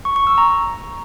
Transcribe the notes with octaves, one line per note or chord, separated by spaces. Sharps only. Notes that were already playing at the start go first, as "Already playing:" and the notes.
C#6
C#6
E6
A#5